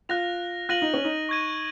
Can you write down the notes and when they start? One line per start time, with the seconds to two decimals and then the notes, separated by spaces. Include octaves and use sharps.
0.09 F4 F#6 A#6 F7
0.69 F4 F#6 A#6 D#7 F#7
0.82 D#4
0.94 C#4
1.04 D#4
1.29 C#6 G#6 D#7